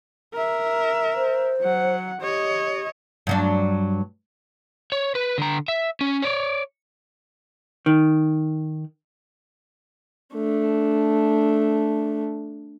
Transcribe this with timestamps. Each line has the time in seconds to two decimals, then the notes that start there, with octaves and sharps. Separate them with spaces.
0.34 A#4 E5
1.15 C5
1.61 F#3 F#5
2.21 G4 C#5 D#5
3.27 G2 F#3 D4
4.92 C#5
5.15 B4
5.38 D3 A#5
5.68 E5
6.01 C#4
6.22 C#5 D5
7.86 D#3
10.35 A3 D4